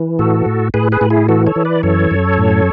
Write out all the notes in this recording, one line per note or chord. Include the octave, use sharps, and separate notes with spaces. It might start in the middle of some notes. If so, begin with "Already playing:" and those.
Already playing: E3
A2 F#4 A4
A2
A2 G#4 B4
G#4 B4
A2
E4 G#4
E3 F#4 A4
A4 C#5
E3
B4 D5
F#2 A4 C#5
F#2
A2